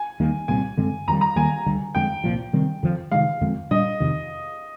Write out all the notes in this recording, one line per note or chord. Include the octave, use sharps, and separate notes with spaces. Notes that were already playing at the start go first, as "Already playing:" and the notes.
Already playing: G#5
D#2 D#3 G3 A#3
C2 A#2 G3 C4 G#5
G2 D3 G#3 C4
F2 D#3 G3 A#5
A#5
D#2 D#3 G3 A#3 G#5
D2 D3 G3
F2 D3 G#3 G5
C2 A#2 F3
C3 D#3 G3 C4
F2 D3 F3
C3 D#3 G#3 F5
F2 D3 G#3 C4
A#2 G3 D4 D#5
F2 C3 D#3